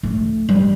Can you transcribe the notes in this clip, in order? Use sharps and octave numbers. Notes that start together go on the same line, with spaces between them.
A3
G3